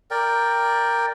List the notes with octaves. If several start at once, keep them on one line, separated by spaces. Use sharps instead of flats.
A#4 D5 G5